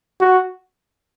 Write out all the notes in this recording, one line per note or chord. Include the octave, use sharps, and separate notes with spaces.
F#4